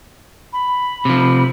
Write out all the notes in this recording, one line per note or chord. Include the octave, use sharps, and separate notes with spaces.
B5
C3 F3